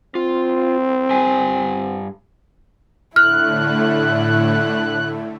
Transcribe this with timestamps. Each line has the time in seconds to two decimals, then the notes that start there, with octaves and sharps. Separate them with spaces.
0.15 C4 F4
1.11 G2 G4 G#5
3.16 A2 D3 A3 E4 F6 F#6